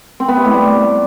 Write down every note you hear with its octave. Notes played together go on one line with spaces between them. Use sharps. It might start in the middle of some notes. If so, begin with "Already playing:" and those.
C4
B3
C3
A2
G3